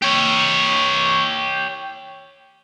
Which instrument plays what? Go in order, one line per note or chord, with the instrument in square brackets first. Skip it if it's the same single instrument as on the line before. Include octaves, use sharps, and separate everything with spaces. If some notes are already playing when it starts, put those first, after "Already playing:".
[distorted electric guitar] G4 C#5